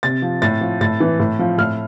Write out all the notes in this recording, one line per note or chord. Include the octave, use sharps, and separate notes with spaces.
C3 A6
F3
A2 A6
F3
A2 A6
E3
A2
F3
A2 F6